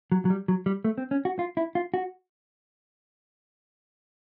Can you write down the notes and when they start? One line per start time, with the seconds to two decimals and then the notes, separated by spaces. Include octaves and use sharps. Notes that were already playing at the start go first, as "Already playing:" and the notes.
0.12 F#3
0.25 F#3
0.30 G3
0.48 F#3
0.66 G3
0.85 A3
0.98 C4
1.11 C#4
1.25 F#4
1.39 F4
1.57 E4
1.75 F4
1.94 F#4